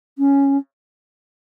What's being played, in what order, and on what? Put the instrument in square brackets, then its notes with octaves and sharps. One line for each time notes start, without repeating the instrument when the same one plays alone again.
[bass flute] C#4